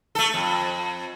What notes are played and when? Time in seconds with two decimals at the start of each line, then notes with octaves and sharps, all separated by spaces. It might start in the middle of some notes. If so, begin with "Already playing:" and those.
0.15 A3 A4
0.34 F2